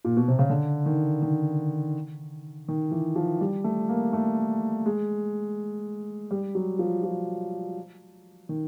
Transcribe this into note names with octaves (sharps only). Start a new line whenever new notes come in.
A#2
B2
C3
C#3
D3
D#3
D#3
D#3
E3
F3
G3
A3
A#3
A3
G#3
G3
F#3
F3
F3
D#3